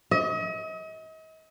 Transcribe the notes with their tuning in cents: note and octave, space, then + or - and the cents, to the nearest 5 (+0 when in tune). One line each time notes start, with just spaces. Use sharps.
D#5 +40